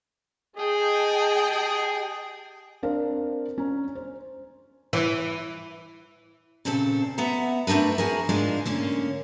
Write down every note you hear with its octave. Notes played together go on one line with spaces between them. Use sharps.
G#4 D#5 G5 A5
G4 G#4
C4 D4 A#4 C5 F5
C#4 A#5
C5
E3
A#2 C#3 C4 A4
B3 E5 F#5 A#5
A3 C4 D4 A#4 B4
F#4 G#4 A#4
G#2 G#3 D4 F4
D3 A#3 C#4